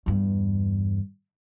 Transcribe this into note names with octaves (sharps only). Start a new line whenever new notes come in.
E2 G2